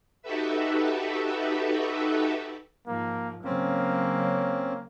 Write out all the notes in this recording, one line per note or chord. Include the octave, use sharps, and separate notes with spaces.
D#4 F#4 G4 A4 B4 E5
G#2 F3 A#3
C#3 F#3 A#3 C4 C#4